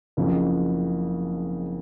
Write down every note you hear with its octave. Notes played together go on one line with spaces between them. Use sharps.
F#1 F2 C#3